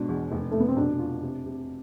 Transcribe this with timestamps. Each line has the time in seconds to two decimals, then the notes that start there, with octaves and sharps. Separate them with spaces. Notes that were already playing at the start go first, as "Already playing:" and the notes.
Already playing: G#2 B2 D4
0.09 E2
0.32 F1
0.51 F1 A3
0.60 B3
0.68 C4
0.77 B2 D4
0.99 F4
1.22 C3
1.46 C3